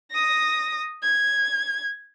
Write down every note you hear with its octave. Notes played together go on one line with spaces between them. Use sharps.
D#6 A#6
G#6